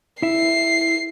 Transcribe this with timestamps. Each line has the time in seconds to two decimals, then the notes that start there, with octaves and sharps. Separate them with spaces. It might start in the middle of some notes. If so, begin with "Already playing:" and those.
0.22 E4 E5 C7